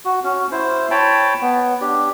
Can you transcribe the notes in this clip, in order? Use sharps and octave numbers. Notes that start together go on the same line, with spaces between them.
F#4
C#4 F#4
E4 C5
C#5 G5 A5 B5
B3
D4 G4